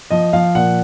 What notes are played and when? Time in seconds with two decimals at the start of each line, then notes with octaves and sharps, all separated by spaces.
0.11 F3 D#5
0.33 F3 F5
0.55 A#2 F#5